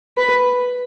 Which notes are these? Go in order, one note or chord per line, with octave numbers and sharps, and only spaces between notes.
B4